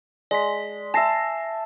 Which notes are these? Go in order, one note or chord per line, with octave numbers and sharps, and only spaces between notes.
G#3 D5 B6
E5 G#5 A5 A#6 C7